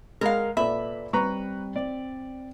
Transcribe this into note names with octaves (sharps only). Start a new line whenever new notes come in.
G#3 A#4 F5
A#2 A4 B4 D5 E5 B5
G3 C4 B4 A#5 C#6
C4 D5